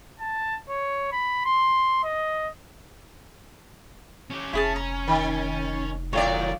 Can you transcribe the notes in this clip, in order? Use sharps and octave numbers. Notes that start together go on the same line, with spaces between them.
A5
C#5
B5
C6
D#5
C#4 G4
F1 C#4 E4 G#4 A5
A#5
D#3
A2 D#3 F#3 F4 C#5 D5